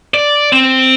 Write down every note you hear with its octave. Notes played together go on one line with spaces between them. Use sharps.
D5
C4